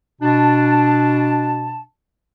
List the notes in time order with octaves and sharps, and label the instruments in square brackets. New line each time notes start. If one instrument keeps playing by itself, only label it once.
[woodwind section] B2 D4 A5